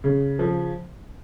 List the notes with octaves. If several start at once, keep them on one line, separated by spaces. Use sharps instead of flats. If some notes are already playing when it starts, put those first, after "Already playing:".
C#3
F3